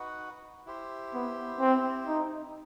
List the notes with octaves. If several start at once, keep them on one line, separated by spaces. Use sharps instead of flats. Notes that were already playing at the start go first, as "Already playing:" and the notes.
Already playing: D#4 F#4 B4 F#5
E4 G4 C5
B3
C4
D#4